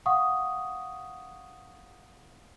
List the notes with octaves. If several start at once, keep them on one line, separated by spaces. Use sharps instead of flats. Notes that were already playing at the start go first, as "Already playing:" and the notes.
F5 F#5 C#6 D#6